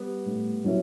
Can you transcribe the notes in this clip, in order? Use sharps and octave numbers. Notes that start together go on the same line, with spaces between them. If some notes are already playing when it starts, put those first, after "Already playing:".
Already playing: G3 B3
A2
F#3 C#4 E4